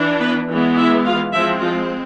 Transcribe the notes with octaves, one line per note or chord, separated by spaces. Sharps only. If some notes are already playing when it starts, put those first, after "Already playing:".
Already playing: E3 D4
B3 B4
E3 G#3 B3
E4 E5
F4 F5
F3 G#3 C4 E4 E5
F3 F4